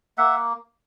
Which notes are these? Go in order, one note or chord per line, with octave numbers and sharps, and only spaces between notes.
A#3 E5 F#5